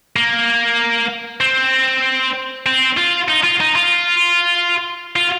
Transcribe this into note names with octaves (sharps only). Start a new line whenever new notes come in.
A#3
C4
C4
F4
D#4
F4
D#4
F4
F4